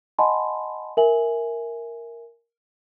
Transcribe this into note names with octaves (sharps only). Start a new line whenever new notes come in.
D#5 F#5 G#5 A5 B5 C6
A#4 E5 G#5 F#7